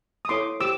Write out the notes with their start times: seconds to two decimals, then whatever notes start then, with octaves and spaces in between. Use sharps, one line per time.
0.25 D#6
0.29 E4 A4 C#5 C6 D6
0.60 G4 C5 D6 E6